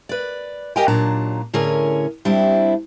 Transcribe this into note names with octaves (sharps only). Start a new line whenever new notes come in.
B4 D5
G4 A#4 D#5 F5 G5 G#5
D#2 A#2 F#3 D4 A5 A#5
A2 D3 C#4 G#4 A#4 C#5
G3 C4 D4 E4